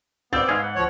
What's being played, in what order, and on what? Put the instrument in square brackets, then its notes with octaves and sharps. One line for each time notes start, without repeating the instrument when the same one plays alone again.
[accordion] B3 [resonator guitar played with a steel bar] C4 D5 [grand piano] E6 G6 A6
[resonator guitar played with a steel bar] G#2 [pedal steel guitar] G#4 F5
[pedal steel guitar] F#5
[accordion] D2 F3 C#5